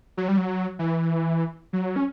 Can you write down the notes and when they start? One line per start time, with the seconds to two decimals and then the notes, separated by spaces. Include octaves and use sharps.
0.17 F#3
0.28 G3
0.37 F#3
0.79 E3
1.73 F#3
1.96 C#4